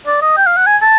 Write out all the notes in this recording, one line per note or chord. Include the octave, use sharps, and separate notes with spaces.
D5
D#5
G5
F5
F#5
G#5
A5